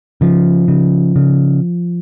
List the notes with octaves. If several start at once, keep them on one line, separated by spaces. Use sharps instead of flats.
C#3 F3
C#3
C#3